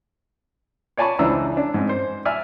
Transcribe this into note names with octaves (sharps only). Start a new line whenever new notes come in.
C#5 D5 G#5 A5 B5 C#6
C#2 E3 D4 C5 A#5 E6
D4
G#2 C4
C5
D5 E5 G#5 F6